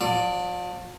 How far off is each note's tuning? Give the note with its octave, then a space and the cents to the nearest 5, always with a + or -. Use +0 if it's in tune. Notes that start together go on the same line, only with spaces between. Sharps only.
F3 +40 D5 +0